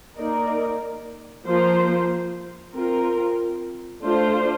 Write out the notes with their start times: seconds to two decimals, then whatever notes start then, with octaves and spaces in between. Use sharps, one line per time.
0.18 A#3 D#4 A#4 D5
1.47 F3 A#3 F4 C5
2.75 C4 F4 A#4
4.03 A3 D4 F4 C5